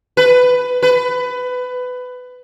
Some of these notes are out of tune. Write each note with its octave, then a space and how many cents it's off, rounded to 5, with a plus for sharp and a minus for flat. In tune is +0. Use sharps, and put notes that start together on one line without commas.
B4 +10
B4 +20